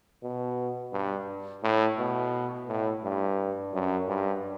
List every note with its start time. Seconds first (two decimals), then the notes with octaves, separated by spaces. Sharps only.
0.23 B2
0.93 G2
1.63 A2
1.99 B2
2.68 A2
3.03 G2
3.73 F#2
4.08 G2